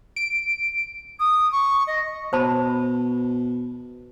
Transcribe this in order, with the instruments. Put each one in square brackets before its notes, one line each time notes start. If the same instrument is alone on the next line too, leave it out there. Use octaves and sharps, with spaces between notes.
[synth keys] D7
[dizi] D#6
C#6
D#5
[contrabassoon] B2 [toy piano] C5 A5 B5